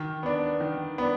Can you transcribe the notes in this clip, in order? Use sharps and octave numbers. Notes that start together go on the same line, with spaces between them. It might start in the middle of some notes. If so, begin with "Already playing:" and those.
Already playing: D#3
B3 D4
D#3
B3 D4